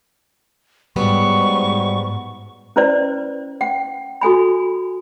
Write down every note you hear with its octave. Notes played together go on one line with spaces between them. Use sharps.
G#2 F#3 G3 B3 C#6
C#4 E4 B4 C5 D5
F#5 G5
F#4 A4 G#5 B5